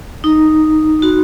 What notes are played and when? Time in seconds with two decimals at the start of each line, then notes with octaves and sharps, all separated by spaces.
0.24 D#4
1.02 F#4